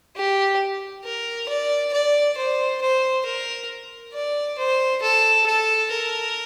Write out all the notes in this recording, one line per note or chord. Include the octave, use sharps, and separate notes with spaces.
G4
A#4
D5
D5
C5
C5
A#4
D5
C5
A4
A4
A#4